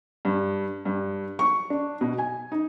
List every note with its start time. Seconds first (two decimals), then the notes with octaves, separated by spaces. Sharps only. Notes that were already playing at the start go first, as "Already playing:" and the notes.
0.25 G2
0.85 G2
1.39 C#6
1.70 D4
2.01 B2
2.18 G#5
2.52 D#4